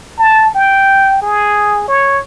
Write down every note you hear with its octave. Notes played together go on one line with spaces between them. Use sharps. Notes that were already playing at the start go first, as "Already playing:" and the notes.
A5
G5
G#4
C#5